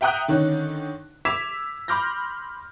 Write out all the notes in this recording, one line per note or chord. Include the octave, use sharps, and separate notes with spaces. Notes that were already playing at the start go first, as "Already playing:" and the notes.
E5 F#5 G5 A#5 D#6 F#6
D3 D#3 C#4 D#4
D6 E6 G#6 B6 E7 F7
B5 C6 D6 F6 G6 A#6